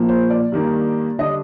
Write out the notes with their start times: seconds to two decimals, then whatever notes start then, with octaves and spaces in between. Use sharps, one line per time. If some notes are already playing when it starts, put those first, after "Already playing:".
Already playing: A#2 F3 A#3
0.09 C5
0.30 D5
0.52 G2 D#3 A#3
1.19 D3 G3 D4 D#5